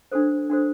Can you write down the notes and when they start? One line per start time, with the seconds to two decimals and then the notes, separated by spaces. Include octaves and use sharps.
0.12 D4 F#4 A4 C5
0.50 D4 F#4 A4 C5